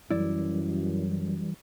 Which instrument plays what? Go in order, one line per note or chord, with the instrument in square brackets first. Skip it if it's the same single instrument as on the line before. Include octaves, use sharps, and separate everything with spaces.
[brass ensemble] F#2 [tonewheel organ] E3 G3 [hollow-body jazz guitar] E4 D5